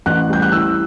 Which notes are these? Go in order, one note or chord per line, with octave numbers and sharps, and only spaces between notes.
A1 F#6
G3 G6
F#6
E3 E6